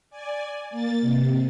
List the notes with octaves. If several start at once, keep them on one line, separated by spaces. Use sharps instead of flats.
D5 G#5
A#3 A6
C3